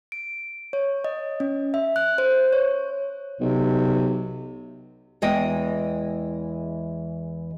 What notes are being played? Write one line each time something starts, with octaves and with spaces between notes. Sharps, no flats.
D7
C#5
D#5
C#4
E5
F#6
C5
C#5
B1 C3
E2 E3 G#3 D#5 G5